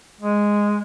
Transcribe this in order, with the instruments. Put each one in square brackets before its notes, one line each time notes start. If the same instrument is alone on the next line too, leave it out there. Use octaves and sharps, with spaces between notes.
[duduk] G#3